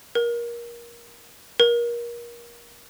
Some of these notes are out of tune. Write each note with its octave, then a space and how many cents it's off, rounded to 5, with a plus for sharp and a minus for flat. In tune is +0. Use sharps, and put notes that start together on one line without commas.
A#4 +20
A#4 +25